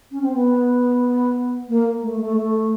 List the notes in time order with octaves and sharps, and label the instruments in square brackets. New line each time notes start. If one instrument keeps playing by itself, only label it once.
[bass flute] C#4
C4
B3
A#3
A3
A3
A3